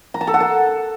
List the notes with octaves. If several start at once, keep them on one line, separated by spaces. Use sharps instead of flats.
A#5
A5
A4
F#5
A5